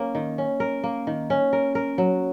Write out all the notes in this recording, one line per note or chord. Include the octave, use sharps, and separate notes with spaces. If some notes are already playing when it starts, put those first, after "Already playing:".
Already playing: A#3 C#4
D#3
C#4
A#4
A#3
D#3
C#4
A#4
A#4
F#3